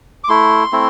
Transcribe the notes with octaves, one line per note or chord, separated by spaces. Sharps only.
D6
A3 E4 C6
A3 C4 E4